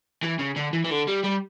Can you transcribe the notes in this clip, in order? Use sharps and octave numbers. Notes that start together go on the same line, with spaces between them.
E3
C#3
D3
E3
E3
D3
G3
G3